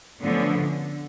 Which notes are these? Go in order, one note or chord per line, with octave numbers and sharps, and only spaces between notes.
D3 F3 A3 B3 C#4 D4
D3